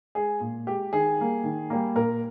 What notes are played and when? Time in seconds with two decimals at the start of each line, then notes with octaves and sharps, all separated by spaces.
0.15 G#3 G#4
0.40 A#2
0.67 G#3 G4
0.93 D#3 G#4
1.19 G3 A#3
1.44 D#3
1.70 G3 A#3
1.95 A#2 A#4